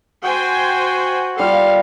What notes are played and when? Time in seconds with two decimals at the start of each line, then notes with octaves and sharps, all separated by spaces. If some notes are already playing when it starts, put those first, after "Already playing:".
0.24 F#4 C5 G5 G#5
1.39 G3 F4 A4 F5